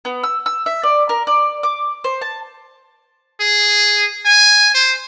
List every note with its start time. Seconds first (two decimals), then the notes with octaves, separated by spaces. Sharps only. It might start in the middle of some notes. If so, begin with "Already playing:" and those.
0.05 B3
0.24 E6
0.46 E6
0.66 E5
0.83 D5
1.09 A#4
1.27 D5
1.63 D6
2.04 C5
2.21 A5
3.40 G#4
4.25 G#5
4.74 C5